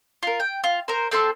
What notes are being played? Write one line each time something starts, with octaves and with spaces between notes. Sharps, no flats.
F4 A#4
G5
F4
A#4 C5
C4 A4 E5 C6